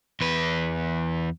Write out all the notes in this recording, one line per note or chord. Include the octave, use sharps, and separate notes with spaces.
E2 B4